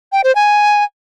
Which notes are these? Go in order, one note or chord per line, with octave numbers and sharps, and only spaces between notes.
G5
C5
G#5